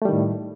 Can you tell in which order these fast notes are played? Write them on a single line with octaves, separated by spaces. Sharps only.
A3 G3 D#3 A2